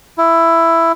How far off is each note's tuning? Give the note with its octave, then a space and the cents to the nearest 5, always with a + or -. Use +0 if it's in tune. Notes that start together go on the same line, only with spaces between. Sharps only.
E4 +10